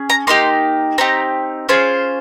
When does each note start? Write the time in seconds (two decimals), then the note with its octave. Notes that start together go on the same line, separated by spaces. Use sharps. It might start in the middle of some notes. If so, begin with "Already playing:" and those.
Already playing: C#4 G#4
0.10 A#5
0.27 A#3 D#4 G4 C6
0.98 C4 D#4 G4 A#5
1.69 C#4 F4 G#4 C5